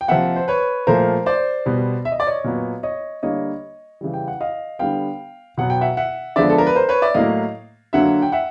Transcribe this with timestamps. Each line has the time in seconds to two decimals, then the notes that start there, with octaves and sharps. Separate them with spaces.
0.01 G5
0.08 C3 F3 A#3 E5 F#5
0.36 C5
0.48 B4 C#5
0.87 A#2 F3 A3 A#4 C5
1.26 C5 D5
1.66 B2 G3 B3
2.05 E5
2.12 D#5
2.20 D5
2.27 C#5 D#5
2.44 A#2 F#3 B3
2.83 C#5 D#5
3.23 D3 G3 A#3 C#5 D#5
4.01 C#3 E3 G3
4.13 G5
4.28 F#5
4.41 D#5 F5
4.79 D3 G3 B3 F5 G5
5.57 B2 F#3 B3 F#5
5.70 G5
5.81 E5 F#5
5.97 E5 F#5
6.36 D3 F3 G#3 B3 D5 E5
6.50 A4
6.58 A#4
6.67 B4
6.76 A#4 C5
6.89 B4 C#5
7.02 D5 E5
7.14 A2 F#3 A#3 D#5 F5
7.93 D3 F#3 A#3 E5 F#5
8.22 G5
8.32 E5 F#5